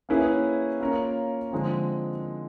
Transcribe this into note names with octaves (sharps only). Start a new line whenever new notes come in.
A#3 C#4 E4 G#4 B4
A#3 C#4 F4 A#4 C#5
D3 F3 G#3 C4